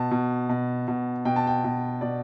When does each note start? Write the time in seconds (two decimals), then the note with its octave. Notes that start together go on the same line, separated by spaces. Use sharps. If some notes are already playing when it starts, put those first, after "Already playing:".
Already playing: B2 A5
0.11 B2
0.49 B2
0.88 B2
1.25 B2 G5
1.36 A5
1.47 G5
1.64 B2
2.01 B2 D5